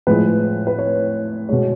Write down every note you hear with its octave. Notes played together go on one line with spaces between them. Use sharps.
A2 F3 G#3 B4
B4
C#5
B2 G#3 C#5